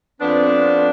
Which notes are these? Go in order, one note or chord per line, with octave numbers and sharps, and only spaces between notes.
F2 B3 C4 D4